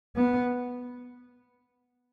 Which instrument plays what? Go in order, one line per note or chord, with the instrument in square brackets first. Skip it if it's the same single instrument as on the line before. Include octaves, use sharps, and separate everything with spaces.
[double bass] B3